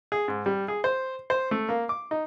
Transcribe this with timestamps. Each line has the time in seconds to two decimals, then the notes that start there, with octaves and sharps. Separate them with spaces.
0.12 G#4
0.28 G#2
0.46 G3
0.68 G#4
0.84 C5
1.30 C5
1.51 A3
1.69 A#3
1.89 D6
2.11 D#4